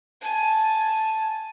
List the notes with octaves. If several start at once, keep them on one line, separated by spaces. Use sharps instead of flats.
G#5 A5